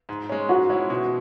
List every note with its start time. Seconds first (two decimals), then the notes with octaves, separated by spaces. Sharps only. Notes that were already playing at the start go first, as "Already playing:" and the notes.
0.09 G#2
0.29 G#3 C#4
0.49 G#2 F#4
0.69 G#3 C#4 E4
0.90 B2